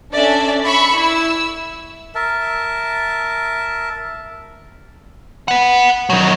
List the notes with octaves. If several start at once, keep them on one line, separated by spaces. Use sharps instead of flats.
C#4 D4 A4 D5 E5
B5 C#6 E6
E4 E6
A#4 E5 A5
B4 F#5
D#3 F#3